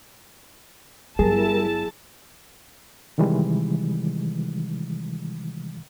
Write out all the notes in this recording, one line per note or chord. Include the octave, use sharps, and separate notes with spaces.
G1 F#3 G3 E4 G#4 A#4 A5
C3 D#3 E3 G3 G#3